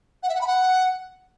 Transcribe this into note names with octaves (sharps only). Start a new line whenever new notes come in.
F#5
E5
F#5
B5
F#5